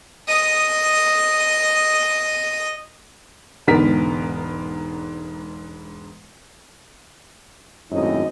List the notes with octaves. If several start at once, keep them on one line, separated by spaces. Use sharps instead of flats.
D#5 D#6
E1 G#2 D3 B3 A#4 B6
G#1 F#2 A2 C3 D#4 D#5